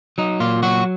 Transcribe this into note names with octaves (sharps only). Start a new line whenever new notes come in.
F#3 D#4
A#2 F4
F#3 F#4